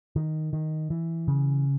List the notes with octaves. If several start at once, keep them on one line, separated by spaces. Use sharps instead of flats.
D#3
D#3
E3
C#3